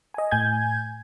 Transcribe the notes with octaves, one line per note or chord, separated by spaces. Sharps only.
D#5 G#5
A2 G#5 G6 G#6